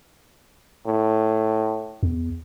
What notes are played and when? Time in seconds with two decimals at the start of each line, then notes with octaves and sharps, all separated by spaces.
0.87 A2
2.03 E2